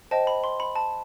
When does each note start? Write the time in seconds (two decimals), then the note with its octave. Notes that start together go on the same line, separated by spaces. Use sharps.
0.11 C5 D#5 G5 A5
0.27 B5
0.44 C6
0.60 B5
0.76 A5